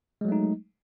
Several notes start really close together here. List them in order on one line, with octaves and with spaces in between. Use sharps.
G#3 F#3 A3 D#4